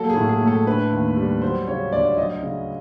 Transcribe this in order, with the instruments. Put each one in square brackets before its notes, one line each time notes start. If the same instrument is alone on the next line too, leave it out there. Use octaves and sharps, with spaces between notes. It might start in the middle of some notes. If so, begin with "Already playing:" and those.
Already playing: [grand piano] F#3 A#3 A4
G#4
A2
G#4
A3
A4
D3 B4
D#2
G3
F#3 C5
C#3 C#5
D2 D5
F#3 D#5
C#3